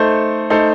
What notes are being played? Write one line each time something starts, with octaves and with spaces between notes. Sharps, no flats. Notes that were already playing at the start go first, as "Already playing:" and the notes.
Already playing: A3 D#4 A4 C5
A3 D#4 A4 C5